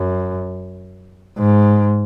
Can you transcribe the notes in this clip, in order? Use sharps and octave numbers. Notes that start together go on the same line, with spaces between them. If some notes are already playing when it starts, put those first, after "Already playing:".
Already playing: F#2
G#2